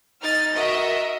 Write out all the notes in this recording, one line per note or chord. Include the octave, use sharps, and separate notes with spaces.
D#4 F6 A6
F#4 A#4 D#5 E5